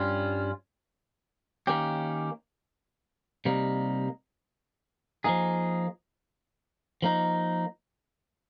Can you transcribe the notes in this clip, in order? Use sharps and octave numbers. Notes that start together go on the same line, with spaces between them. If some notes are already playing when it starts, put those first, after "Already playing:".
Already playing: G2 G3 C#4 F4
D#3 A#3 C#4 G4
C3 G3 A#3 D#4
F3 A#3 D#4 G#4
F3 A#3 D#4